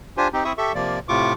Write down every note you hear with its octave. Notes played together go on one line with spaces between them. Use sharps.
D4 F4 G4 C5 G#5
C4 D#4 G4
C4 E4 E5 C#6 D#6
G4 A4 E5 C#6
C3 F3 A#3 D5
A2 C3 F4 C#6 D6